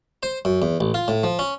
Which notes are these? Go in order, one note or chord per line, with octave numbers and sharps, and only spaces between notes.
C5
F#2
E2
A1
F4
A2
F3
C#4